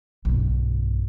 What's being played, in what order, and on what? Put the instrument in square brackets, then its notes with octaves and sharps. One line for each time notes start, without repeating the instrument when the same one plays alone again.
[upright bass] B1 G2